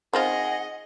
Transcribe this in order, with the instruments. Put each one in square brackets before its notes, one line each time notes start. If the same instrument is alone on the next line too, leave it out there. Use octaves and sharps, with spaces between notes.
[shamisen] D#3 C4 F4 [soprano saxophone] G#4 [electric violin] D#5 [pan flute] F#5